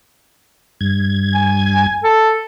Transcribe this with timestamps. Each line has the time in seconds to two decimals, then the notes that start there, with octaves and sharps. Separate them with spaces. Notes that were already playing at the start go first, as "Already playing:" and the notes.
0.81 G2 G#6
1.35 G#5
2.04 A4